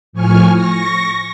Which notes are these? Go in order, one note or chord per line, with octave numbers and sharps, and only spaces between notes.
A2 F3 G#5 C#6 F6
C#6 A#6